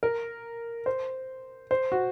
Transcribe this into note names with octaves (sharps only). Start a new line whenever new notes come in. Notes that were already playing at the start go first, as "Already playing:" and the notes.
A#4
C5
C5
F#4